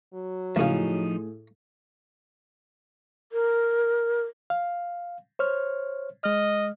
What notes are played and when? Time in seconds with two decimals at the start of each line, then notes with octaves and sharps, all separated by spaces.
0.14 F#3
0.56 C#2 A2 C#3 F3 D#4 G#4
3.32 A#4
4.50 F5
5.39 C5 C#5 F6
6.24 G#3 D#5 F6